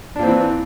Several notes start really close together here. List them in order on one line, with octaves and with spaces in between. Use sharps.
D4 A#2 C4 E3